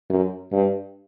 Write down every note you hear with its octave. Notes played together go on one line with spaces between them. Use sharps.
F#2
G2